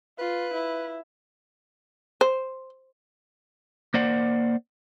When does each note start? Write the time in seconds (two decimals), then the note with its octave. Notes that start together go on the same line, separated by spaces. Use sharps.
0.19 F4 B4
0.53 E4
2.21 C5
3.94 A#3 C5 D5 F#5